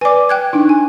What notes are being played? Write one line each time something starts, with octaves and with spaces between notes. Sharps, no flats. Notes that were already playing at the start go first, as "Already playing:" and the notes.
B4 D5 G#5 D6
G5 F#6 G#6
D4 D#4
G#5